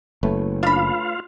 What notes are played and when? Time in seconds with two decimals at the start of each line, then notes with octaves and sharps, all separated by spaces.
0.23 F#1 A3 B4 C#5
0.63 D4 F4 F5 B5